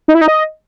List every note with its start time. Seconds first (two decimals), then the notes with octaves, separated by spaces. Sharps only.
0.08 D#4
0.15 E4
0.21 D#4
0.28 D#5